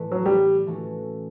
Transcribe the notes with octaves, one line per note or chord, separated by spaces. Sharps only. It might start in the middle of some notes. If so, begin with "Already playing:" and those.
Already playing: A2 E3 A3 E4 B4 D5
F#3
G3
E3 A3 C#4 F#4 A4